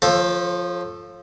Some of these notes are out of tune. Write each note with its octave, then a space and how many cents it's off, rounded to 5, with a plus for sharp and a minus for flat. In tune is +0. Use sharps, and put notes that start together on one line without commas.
F3 +0 A4 -5 C#5 -40